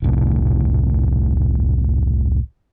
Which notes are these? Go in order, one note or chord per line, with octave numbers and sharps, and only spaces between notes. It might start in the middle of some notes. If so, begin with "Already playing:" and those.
E1 C2 A2